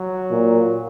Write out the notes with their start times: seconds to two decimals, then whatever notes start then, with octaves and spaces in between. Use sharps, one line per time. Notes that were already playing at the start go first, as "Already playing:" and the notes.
Already playing: F#3
0.31 A#2